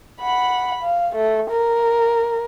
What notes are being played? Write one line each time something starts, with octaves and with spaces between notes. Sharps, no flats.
F#5 B5
F5
A3
A#4